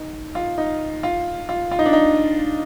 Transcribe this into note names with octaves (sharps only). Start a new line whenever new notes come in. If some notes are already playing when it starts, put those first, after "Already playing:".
Already playing: D#4
F4
D#4
F4
F4
F4
D#4
D4
D#4